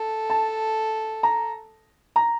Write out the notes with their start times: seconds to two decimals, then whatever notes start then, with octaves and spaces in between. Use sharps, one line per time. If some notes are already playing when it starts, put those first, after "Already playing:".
Already playing: A4
0.30 A5
1.23 A#5
2.16 A#5